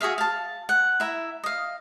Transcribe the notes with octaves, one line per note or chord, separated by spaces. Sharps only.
F#4 G#4 E5 F5
F5 A5
F#5
E4 E5 A#5
D#5 F5